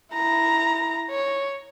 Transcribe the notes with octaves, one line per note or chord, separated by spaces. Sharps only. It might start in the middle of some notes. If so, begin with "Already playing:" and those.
E4 A#5
C#5